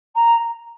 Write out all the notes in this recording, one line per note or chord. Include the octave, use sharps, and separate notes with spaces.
A#5